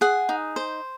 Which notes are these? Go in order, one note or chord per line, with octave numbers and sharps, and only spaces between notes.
G#4 F#5
D#4
C5